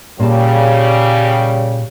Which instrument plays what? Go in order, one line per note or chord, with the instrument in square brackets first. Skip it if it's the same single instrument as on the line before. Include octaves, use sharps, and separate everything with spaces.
[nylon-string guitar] A#2 A5 [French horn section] C#3 G3